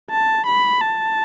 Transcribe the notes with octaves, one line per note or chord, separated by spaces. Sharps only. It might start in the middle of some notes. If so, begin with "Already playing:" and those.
A5
B5
A5